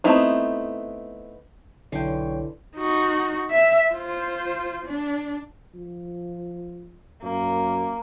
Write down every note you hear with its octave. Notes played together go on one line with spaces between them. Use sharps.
A3 B3 C4 D#4 E4
B1 D3 E3 C#5 G5 C6
D#4 F#4
E5
F4 C5
D4
F3
F#2 A#3